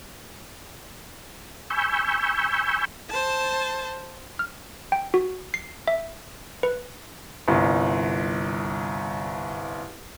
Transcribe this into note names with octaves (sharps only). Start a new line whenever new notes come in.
G#5 B5 C#6 E6 G6
C5 A5
F6
G5
F#4
C7
E5
B4
G1 C2